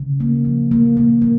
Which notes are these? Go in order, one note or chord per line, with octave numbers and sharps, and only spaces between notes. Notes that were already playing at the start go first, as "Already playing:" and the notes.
Already playing: C#3
A#3
F3
A#3
A#3
A#3